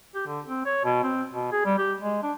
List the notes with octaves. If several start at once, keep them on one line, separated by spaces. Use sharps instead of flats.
G4
D3
C4
C#5
B2
C4
B2
G#4
G3
G4
G#3
D4